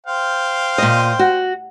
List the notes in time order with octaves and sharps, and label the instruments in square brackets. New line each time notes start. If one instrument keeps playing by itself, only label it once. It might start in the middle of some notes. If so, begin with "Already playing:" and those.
[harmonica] C5 F5 G5
[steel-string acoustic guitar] A#2 D#5
F#4